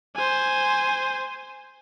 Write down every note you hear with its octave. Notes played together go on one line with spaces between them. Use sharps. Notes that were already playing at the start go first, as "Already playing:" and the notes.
C5 G#5